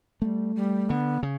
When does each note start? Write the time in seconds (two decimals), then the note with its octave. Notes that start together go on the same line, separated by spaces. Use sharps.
0.22 G3 A3 B3
0.56 G3
0.89 D3 B3
1.23 C#3